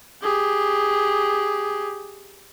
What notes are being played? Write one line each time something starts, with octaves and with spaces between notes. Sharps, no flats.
G4 G#4